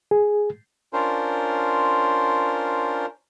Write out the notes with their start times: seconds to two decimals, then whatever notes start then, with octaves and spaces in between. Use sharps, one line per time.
0.11 G#4
0.93 C#4 D4 F4 A#4 C5